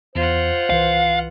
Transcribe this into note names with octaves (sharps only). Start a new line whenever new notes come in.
E2 F4 C5 F#5
C2 E3 B4 F5